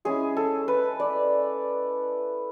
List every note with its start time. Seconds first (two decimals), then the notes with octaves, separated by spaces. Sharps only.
0.05 G#3 C#4 E4 G#4
0.37 A4
0.68 B4
1.00 D5